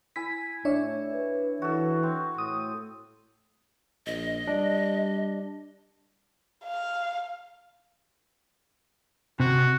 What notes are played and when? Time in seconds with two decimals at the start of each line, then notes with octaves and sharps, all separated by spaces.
0.16 E4 G#5 B6
0.65 A2 D4 C#5 E5
1.13 B4
1.62 E3 F#4 A4
2.03 C4
2.38 A2 D#6
4.06 A#1 D#5
4.47 G3 D4
6.65 F5
9.40 C3 F#4